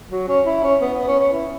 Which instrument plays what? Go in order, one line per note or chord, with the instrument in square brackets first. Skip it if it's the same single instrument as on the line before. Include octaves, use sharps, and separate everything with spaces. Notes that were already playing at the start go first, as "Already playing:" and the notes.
[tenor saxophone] F#3
C#4
E4
C#4
B3
B3
C#4
C#4
E4